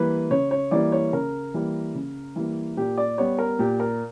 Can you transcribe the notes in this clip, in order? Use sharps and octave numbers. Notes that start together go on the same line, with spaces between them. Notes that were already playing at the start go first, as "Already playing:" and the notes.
Already playing: E3 G3 A#3 B4
C#3 C#5
C#5
E3 G3 A#3 D5
C#5
C#3 A#4
E3 G3 A#3
C#3
E3 G3 A#3
A#2 G4
D5
G3 B3 C#5
A#4
A#2 G4
A#4